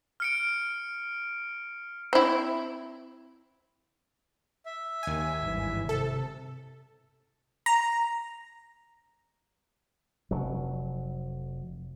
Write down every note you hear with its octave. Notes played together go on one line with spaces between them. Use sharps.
F6 C#7 D7
C4 E4
E5
D#2 G#5
G#1 G2 E3
C3 A4
A#5
F1 F#3